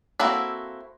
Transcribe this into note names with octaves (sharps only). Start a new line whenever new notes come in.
A#3 C4 E4 F#4 A4